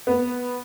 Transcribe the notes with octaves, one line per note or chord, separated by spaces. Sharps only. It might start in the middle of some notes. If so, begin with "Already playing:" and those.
B3